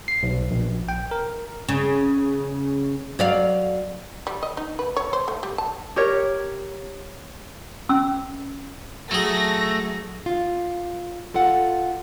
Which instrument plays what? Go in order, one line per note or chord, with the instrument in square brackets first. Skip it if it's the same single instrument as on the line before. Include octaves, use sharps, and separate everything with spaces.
[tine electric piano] C7
B1
A#1
G5
A#4
[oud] C#3
F#3 D5 F5
[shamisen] G3
D#5
D#4
B4
C#5
C5
A3
G3
A5
[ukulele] G4 A#4 C#5
[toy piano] C#4 E6
[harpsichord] F#3 G#4 [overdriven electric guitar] A3 [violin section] A#6
[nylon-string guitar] F4
F4 A4 F5 F#5